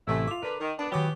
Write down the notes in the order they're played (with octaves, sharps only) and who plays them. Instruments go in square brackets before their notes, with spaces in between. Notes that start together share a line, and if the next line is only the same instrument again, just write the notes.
[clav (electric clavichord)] A1 C3 G#5 [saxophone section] A3 E4
[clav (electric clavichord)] F4 E5 [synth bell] D6 F7
[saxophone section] D3 D4 B4 [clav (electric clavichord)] A#4
[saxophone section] D#3
[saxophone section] B3 D4 [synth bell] A5
[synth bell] D#3 D6 G7 [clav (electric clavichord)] F#3 [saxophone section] B3 C#4 G4